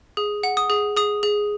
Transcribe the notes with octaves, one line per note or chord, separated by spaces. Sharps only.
G#4
F#5
D#6
G#4
G#4 D#6
G#4